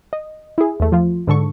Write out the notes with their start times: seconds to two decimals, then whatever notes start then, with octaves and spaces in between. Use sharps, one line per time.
0.13 D#5
0.58 E4 G#4
0.80 E2 A3
0.92 F3 F4
1.27 G#2 D3 A4 C#6